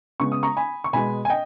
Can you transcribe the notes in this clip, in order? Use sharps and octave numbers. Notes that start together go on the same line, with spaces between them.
C#3 G#3 B3 C#6
D#6
A#5 C#6
G#5 B5
C#6
B2 G#3 B3 G#5 B5
G#5
D#5 G5